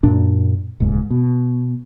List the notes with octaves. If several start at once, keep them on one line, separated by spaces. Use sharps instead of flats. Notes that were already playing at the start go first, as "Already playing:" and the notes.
F#2 A#2 D4
D#1 C#2 G#2
B2